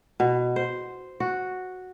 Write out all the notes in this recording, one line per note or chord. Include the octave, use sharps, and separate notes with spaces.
B2
C5
F#4